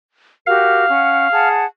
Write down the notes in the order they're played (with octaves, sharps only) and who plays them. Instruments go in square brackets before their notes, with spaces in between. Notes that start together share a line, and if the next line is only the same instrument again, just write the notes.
[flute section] F#4 G4 A#4 [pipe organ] F5
[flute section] C#4 F#5
G#4 F#5 A5